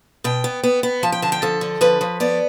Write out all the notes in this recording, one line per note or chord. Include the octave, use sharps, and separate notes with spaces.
B2 G5
B3
B3
B3
F3 A5
G5
D3 A5
G5
F3 A4
D3
F3 B4
F3
B3 D5